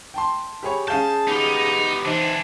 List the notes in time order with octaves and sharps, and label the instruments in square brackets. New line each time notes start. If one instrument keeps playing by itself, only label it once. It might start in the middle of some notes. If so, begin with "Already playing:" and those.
[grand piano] G5 A5 C6
[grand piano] G4 G#4 C#5 [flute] B5
[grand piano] C#4 F5 G6 [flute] G#4 [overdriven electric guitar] A5
[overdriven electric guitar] B3 G4 [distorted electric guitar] D#4
[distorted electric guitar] E3 D4 [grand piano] C4 D#4